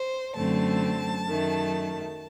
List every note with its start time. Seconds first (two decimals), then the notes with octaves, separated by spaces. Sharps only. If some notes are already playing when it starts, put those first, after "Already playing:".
Already playing: C5
0.36 F#2 D3 A3 C4 A5
1.27 F#2 D#3 A3